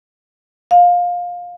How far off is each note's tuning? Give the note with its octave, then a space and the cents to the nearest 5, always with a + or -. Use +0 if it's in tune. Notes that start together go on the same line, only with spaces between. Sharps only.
F5 +20